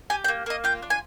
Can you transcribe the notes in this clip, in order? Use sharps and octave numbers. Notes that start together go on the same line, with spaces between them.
G4 G#5
G5
A#3
A#3 D#5
F4 G5
D4
G#5